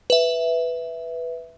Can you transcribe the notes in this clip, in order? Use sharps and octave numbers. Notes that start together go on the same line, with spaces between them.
B4 E5